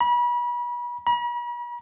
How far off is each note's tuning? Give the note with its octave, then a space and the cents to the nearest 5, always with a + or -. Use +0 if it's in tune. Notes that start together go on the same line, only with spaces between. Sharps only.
B5 -35
B5 -45